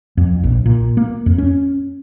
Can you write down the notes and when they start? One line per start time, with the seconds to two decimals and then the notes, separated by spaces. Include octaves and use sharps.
0.17 F2
0.43 A#1
0.66 A#2
0.97 A#3
1.26 F2
1.38 C#4